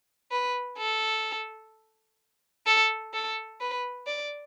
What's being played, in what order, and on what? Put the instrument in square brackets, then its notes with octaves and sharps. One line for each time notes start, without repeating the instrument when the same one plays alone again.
[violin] B4
A4
A4
A4
B4
D5